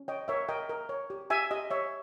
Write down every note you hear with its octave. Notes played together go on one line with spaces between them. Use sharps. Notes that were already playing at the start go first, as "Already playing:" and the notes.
Already playing: C#4
C#5 D#5 G5
A#4 C#5 E5
A#4 D#5 G5
A#4
C#5
G4
G4 E5 G#5
G4 D#5
C#5 E5